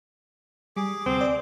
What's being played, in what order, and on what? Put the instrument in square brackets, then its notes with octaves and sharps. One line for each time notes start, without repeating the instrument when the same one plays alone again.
[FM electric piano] G3 [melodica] G#4 D6
[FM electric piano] D2 C3 [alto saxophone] C4
[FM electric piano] D5